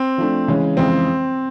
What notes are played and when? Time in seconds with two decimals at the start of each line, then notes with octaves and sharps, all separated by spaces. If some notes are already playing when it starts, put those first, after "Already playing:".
Already playing: C4
0.18 F3 A3 D4
0.48 C#3 E3 G#3 C#4
0.77 F2 C#3 E3 G#3 C4